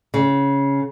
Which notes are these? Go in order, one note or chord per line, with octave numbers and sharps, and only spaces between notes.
C#3